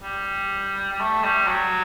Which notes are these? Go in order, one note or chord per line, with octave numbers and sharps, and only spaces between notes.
G3
G3
A3
G3
F#3